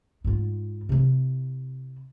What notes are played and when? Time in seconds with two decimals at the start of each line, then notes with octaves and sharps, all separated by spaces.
0.24 G#2 F4
0.89 C3 E4